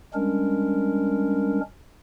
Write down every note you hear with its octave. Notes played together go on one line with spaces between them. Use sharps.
G3 G#3 C#4 D4 A#4